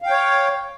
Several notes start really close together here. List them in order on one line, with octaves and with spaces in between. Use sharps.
F5 G5 C#5